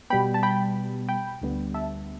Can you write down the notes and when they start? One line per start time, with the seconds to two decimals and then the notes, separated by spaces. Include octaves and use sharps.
0.10 B2 G3 B3 G5 B5
0.34 A5
0.43 G5 B5
1.09 G5 B5
1.41 D2 D3 G3 B3
1.74 E5 A5